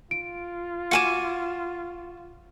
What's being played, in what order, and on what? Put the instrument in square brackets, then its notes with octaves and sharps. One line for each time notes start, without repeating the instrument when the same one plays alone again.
[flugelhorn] F4 [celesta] D7
[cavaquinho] F#4 G#5 D6 [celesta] C#7 D#7 E7